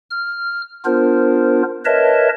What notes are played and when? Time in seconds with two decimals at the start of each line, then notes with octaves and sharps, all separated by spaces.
0.10 F6
0.85 B3 D4 F4 A#4 C5
1.85 A#4 B4 C#5 D#5 E5 A5